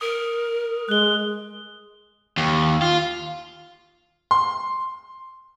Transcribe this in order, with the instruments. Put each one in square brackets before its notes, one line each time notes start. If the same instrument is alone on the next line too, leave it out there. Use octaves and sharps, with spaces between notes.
[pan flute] A#4 [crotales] D#6
[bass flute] G#3 [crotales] F#6 G7
[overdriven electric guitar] D#2
F4
[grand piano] C6